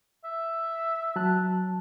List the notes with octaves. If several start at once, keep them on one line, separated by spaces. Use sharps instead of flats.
E5
F#3 A5 F#6